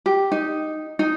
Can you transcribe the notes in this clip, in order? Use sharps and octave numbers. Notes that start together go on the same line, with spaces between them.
G4
D#4
D#4